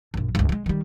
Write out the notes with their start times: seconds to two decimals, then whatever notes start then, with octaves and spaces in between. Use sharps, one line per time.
0.14 A#1 F#2
0.35 C#2 G2
0.49 E3 G#3
0.66 D#3 G3